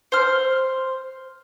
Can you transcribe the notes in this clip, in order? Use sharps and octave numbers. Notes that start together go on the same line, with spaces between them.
C5 F6